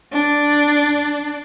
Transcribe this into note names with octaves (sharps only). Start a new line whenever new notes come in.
D4